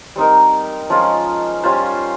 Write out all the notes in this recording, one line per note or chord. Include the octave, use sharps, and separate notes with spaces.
G3 C4 D#4 A#4
F3 G#3 C#4 F4
G3 C#4 F4 C5